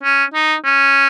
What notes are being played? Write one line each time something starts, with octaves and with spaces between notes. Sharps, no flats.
C#4
D#4
C#4